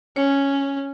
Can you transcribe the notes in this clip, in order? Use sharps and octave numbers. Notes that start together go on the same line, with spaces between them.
C#4 C#5